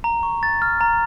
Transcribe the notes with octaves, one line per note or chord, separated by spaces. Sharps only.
A#5
C#6
A6
F6
A#5